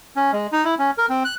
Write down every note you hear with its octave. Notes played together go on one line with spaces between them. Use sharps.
C#4
G#3
D#4
E4
C#4
A#4
C4
F#6